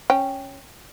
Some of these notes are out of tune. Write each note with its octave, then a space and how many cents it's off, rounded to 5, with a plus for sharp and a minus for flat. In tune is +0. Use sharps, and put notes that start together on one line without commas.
C#4 -5 G5 +5